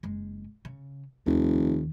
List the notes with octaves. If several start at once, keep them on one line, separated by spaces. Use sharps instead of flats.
F#1 G#3
C#3
F1 D#2 D#3